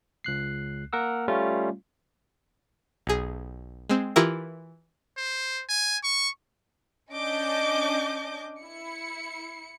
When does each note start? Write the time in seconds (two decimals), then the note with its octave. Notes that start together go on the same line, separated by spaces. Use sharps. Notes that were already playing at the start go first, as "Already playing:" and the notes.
0.24 C#2 F#6 C7
0.93 A#3 A#4 F#5 E6
1.28 G3 A3 C#4 F4
3.07 B1 G#4
3.89 G#3 C4
4.16 E3 E4 F4 G4 A#4 E5
5.17 C5
5.69 G#5
6.04 C#6
7.11 C#4 D4 D#5 D6 G6
8.61 E4 C#7